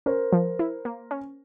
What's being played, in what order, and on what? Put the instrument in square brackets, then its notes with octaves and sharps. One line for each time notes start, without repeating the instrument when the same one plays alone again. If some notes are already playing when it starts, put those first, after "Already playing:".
[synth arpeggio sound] C#4 [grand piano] A#4 C5
[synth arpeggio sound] F3
E4
A#3
C#4